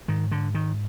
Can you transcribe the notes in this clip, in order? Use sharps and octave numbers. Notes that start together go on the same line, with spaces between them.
G#2 D#3
D3
D#3